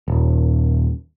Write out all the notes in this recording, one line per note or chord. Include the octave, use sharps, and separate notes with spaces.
D#1